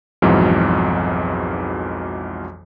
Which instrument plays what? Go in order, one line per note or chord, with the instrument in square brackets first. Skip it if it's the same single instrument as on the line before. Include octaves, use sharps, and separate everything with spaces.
[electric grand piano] B1 F2 G#2 E3 F#3